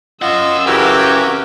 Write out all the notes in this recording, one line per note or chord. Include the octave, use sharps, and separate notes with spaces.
C#4 F4 D#5 F#5 E6
C#3 E3 F#4 G4 A#4